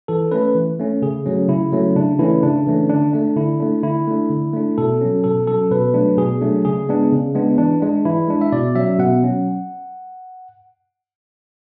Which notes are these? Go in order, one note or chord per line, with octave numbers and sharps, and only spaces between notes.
E3 A4
A3 C#4 B4
E3
A3 C#4
C#3 G#4
F#3 A3 C#4
C#3 E4
F#3 A3 C#4
C#3 D4
E3 A3 C#4 E4
C#3 D4
E3 A3 C#4
D3 D4
A3 D4
D3 E4
A3 D4
D3 E4
A3 D4
D3
A3 D4
B2 A4
F#3 C#4
B2 A4
F#3 C#4 A4
B2 B4
F#3 A3 D4
B2 G#4
F#3 A3 D4
C#3 G#4
G#3 B3 D4
C#3
G#3 B3 D4
E3 D4
G#3 D4
E3 E4
G#3 D4
E5
B2 D5
F#3 C#4 E5
B2 F#5
F#3 C#4